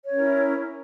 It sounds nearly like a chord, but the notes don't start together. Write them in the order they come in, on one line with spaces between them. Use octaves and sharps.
C#5 C#4 A#4 E4